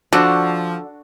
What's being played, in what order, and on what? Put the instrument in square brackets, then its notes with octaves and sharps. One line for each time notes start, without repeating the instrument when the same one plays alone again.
[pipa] D3 [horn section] F3 [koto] D4 C5 F#5 [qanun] F#4